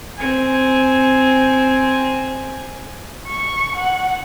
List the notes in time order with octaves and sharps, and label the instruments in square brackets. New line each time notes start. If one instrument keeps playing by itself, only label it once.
[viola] C4 G#5
[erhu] C#6
F#5